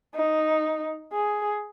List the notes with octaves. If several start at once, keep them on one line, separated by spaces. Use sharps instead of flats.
D#4
G#4